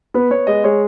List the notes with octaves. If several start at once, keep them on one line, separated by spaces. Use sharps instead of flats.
B3 B4
B3 C#5
G#3 D#5
G#3 C#5